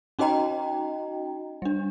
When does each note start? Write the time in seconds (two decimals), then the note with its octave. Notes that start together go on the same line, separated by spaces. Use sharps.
0.19 C#4 D#4 F#4 D#5 G5 A#5
1.62 G3 D4